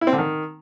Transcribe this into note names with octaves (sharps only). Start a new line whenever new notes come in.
E4
C4
D3
D#3